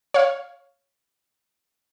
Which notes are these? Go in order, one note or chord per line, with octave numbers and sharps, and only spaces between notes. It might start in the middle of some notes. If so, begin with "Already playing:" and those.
C#5 F5